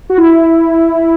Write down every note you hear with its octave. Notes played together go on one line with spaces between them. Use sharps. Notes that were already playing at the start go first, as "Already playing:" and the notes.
F#4
E4
E4